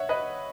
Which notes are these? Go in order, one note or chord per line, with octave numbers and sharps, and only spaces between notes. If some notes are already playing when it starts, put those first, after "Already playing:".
Already playing: C#5 E5 F#5
B4 D#5